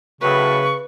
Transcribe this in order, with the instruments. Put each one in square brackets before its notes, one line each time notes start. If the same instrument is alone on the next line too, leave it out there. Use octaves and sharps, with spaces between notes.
[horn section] A2 F#3 [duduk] C#3 [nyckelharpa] B4 [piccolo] C#6